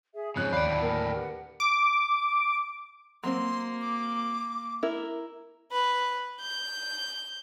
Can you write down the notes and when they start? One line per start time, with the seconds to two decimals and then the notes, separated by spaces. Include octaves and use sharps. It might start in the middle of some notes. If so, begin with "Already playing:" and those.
0.14 G#4 E5
0.36 F2 G#2 C#3 C#5 F#6 G6
0.53 D#2 D5 F5 G5 B5 F#6
0.66 D2 A2 F5
0.81 A#3 A#4 G5 G#5
1.14 G4 B4 F#5
1.60 D6
3.24 F#3 A#3 C4 C6
3.81 D6
4.83 E4 A#4
5.72 B4
6.41 G6